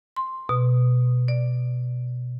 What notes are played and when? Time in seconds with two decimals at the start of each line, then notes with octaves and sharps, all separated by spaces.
0.16 C6
0.49 B2
1.28 D5